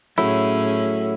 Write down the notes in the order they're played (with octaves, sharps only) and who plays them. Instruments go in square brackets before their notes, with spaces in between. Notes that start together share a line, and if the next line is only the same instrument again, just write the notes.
[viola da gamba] A2 C#4 G#4 [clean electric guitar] F#3 A3 E4